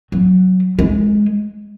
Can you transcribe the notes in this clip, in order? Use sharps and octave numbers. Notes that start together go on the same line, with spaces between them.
F#3
G#3